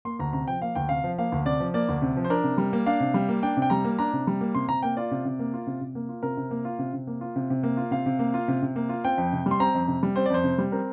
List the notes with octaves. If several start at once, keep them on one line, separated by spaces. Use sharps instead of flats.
A#3 C6
D2 A#5
C3 A#5
F3 G5
A#3 F5
D2 G5
C3 F5
F3
A#3 F5
D2
C3 D5
F3
A#3 D5
D2
C3
F3
C5
D4 A#4
C3
G3
A#3
D4 F5
C3
G3
A#3
D4 G5
C3
G5
G3 A#5
A#3
D4 A#5
C3
G3
A#3
C3 C6
C3 A#5
A#3 G5
F4 D5
C3
C3
A#3
F4
C3
C3
A#3
F4
C3 A#4
C3
A#3
F4
C3
C3
A#3
F4
C3
C3
A#3
F4
C3 F5
C3
A#3
F4
C3
C3
A#3
F4
C4 G5
F2
C3
G3
C6
C4 A#5
F2
C3
G3
C4 C5
D5
F2 C5
C3
G3
C4 A#4